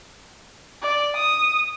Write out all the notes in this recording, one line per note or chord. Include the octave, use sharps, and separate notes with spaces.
D5
D#6